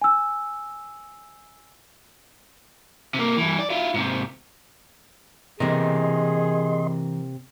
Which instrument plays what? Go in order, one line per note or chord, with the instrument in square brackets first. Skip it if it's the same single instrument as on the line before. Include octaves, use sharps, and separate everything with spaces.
[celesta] G#5 E6
[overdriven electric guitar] C3 A#3
G2 E3
D5
E4 F4
G#2 C3
[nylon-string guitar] C3 A#3 [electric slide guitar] E3 A#4 [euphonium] G#4 [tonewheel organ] D#5 C6